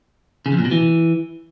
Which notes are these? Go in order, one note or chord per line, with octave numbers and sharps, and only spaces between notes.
C#3
F2
A#2
B2
E3